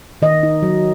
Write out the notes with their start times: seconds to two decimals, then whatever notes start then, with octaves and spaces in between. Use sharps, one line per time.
0.22 D#3 D#5
0.43 D#4
0.62 F#3